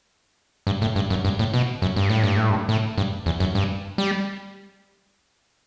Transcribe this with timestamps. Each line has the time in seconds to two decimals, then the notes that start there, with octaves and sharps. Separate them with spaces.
0.67 G2
0.82 A2
0.96 G2
1.10 F#2
1.25 G2
1.39 A2
1.54 B2
1.82 F#2
1.96 G2
2.10 A2
2.24 G2
2.37 A2
2.50 G2
2.69 A2
2.98 G2
3.26 E2
3.40 F#2
3.55 G2
3.98 G3